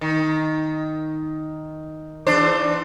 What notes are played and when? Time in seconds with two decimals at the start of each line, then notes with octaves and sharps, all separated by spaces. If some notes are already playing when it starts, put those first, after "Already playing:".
0.01 D#3
2.27 E2 D4 C5